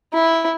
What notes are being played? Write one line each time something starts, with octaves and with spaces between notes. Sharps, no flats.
E4